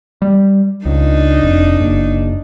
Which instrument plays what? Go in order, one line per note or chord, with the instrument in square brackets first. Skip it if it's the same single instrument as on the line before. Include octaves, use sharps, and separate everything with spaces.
[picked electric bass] G3
[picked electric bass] C#2 [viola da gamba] D4 D#4
[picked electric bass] F1
F#1